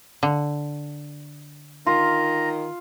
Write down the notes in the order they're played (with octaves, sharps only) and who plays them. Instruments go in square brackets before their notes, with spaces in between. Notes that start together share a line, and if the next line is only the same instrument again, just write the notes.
[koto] D3
[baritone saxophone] D#3 [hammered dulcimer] F4 [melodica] A#5